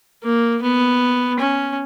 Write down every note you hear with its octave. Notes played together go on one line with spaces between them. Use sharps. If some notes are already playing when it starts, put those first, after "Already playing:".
A#3
B3
C#4